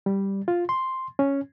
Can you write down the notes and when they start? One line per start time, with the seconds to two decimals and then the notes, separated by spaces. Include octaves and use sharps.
0.06 G3
0.48 F4
0.69 C6
1.19 C#4